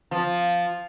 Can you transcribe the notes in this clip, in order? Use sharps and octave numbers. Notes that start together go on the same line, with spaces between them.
F3